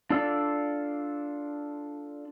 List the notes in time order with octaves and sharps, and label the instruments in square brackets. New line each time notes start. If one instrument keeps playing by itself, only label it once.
[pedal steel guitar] D4 F4 A4 D5 E6